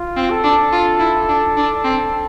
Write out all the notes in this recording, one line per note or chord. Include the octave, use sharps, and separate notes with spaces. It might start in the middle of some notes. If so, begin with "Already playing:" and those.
Already playing: F4
C4
A4
D4
F4
E4
D4
D4
C4